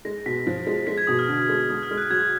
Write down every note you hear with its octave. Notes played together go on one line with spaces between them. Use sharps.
G#3 A#6
B2 B6
F3
G#3
G#3 B6
G#6
B2 D#6
F6
D3
G#3
G#3 D#6
F6
G#3
F#6
F#3 G#6